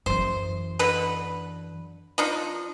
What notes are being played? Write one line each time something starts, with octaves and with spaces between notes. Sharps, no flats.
F#2 E3 C5
B2 D3 B4
F3 D4 D#4